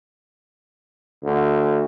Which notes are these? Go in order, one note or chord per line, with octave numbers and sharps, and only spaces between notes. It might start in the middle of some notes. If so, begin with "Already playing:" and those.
D2